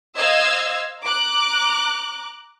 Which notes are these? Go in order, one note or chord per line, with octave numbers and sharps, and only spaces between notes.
C5 D#5 F5 E6 G#6
A#5 D6 F#6